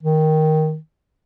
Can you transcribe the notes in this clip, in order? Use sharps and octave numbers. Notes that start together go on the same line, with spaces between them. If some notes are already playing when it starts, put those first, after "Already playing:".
D#3